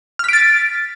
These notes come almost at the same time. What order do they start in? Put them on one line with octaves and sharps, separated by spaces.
F6 B6 D7 A6